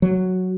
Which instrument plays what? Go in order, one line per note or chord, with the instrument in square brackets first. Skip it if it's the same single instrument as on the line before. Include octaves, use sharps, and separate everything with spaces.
[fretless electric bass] F#3